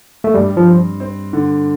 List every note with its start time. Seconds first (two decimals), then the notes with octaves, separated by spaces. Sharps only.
0.24 A3
0.34 G2 G3
0.57 F3
0.67 C4
1.00 C4
1.33 D3